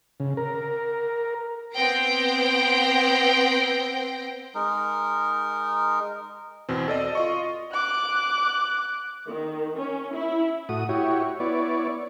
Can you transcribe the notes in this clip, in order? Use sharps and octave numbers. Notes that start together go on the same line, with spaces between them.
C#3
A#4
B3 C4 G5 A#6 C7 D7
G#3 D#4 A#4
E2 B2 C4
A4 D5 D#5
F4 D#5 C#6
D6 F#6
D#3
C#4
E4
A2 F#4 D#6
E4 F#4 G4 C#5
B3 E4 C#5 D5